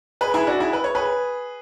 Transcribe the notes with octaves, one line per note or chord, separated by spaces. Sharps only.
G#4 B4
E4 G#4
D4 F#4
E4 G#4
B4
C#5
G#4 B4